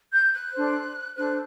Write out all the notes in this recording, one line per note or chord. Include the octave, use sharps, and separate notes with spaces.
G6
F#6
D4 A4 C5
D4 A4 C5 F#6